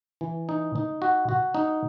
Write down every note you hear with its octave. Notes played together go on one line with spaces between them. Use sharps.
E3
D#4
D#4
F#4
F#4
D#4